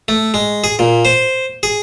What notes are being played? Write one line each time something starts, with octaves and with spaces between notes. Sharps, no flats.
A3
G#3
G#4
A#2
C5
G#4